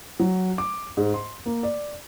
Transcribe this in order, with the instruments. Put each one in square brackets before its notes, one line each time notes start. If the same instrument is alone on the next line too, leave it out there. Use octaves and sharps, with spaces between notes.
[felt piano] F#3
D6
G#2
C6
A#3
D5